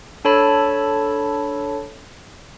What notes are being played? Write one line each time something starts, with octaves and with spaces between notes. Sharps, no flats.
D4 A4 C#5 A5 B5